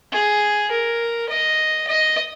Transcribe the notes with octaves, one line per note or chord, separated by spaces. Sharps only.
G#4
A#4
D#5
D#5